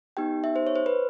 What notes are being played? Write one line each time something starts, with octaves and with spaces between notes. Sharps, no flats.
B3 D#4 G4 G5
E5
C5
C#5
C5
B4